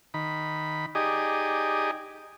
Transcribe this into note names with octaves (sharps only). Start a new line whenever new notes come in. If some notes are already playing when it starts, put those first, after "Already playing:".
D#3 B5
D#4 G4 G#4 D5 D#5